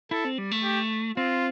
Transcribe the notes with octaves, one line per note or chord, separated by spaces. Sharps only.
E4 A4
C4
G3
A3
G4
C4 F4